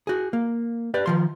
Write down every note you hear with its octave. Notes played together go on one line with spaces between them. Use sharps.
F#4 G#4
A#3
G4 B4 D5
D#3 F3 C6